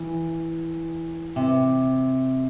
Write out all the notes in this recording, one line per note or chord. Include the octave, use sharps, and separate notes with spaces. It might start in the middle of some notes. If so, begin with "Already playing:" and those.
Already playing: E3
C3